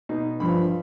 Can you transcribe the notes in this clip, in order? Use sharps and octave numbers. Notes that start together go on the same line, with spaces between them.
B2 D#4
G2 F3 B5